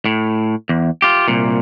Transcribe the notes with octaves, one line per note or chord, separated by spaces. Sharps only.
A2
E2
F4 G4
C2 A#2